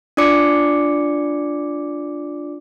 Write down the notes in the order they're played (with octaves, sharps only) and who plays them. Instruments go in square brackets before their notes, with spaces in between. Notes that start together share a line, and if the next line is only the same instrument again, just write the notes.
[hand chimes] D4 F4 D5 D6 C#7